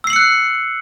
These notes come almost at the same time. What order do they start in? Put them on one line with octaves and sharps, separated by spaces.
E6 C7 F#7 C#7 F#6